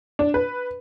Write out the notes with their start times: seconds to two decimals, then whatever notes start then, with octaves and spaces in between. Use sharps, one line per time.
0.19 D4
0.34 B4